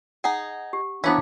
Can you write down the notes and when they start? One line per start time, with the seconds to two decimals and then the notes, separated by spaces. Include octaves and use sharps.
0.24 D#4 G#4 F#5
0.73 G4
1.04 E3 B3 C#4 D4 E4 C5 C#5 F5